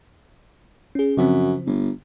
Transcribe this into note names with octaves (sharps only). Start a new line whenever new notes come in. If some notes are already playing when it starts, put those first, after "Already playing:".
C#4 G#4
F#2 C#3 F3 C4
G1